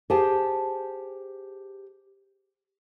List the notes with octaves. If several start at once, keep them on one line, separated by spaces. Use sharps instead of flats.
G4 G#4 C5 G#5 A5